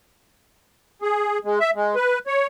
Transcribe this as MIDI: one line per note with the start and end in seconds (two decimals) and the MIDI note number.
1.02 1.38 68
1.45 1.59 56
1.60 1.71 76
1.75 1.95 56
1.95 2.19 71
2.27 2.47 73